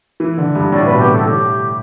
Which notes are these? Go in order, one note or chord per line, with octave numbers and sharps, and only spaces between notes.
E3
D3
G2
A2 D5
B2 B4
G4
B2
A4
A2 G4